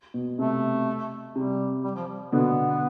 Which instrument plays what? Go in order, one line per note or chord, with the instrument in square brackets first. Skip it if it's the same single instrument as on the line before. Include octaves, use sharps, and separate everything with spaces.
[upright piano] B2
[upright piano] C3 [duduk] A3
[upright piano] C3 [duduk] G3
[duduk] G3
F3
G3
[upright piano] B2 D3 [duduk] B3